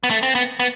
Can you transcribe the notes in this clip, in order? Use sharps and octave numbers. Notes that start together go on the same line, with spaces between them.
B3
A3
C4
B3
B3